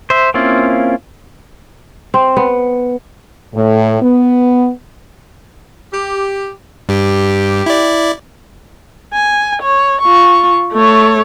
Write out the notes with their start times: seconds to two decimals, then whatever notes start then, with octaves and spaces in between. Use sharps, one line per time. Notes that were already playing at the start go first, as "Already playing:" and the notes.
0.10 C5 E5
0.34 A#3 C4 C#4 E4 F4
2.14 C4
2.37 B3
3.54 A2
4.02 B3
5.92 G4
6.89 G2 G4
7.66 E4 D5
9.14 G#5
9.62 C#5
10.01 F4 C#6
10.73 A3 C#5